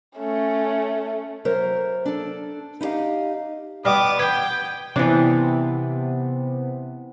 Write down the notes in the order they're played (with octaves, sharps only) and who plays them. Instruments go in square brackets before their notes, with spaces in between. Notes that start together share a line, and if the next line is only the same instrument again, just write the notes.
[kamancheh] A3 C#4
[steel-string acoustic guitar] F#3 A#4 C5 E5
D4 A4
D#4 E4 G4 D#5 F5
[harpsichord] G3 D#5 [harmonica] B3 [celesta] G5 F6 [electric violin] D6
[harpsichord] B4 [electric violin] G5 [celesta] G#6
[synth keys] C3 B3 [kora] E3 D4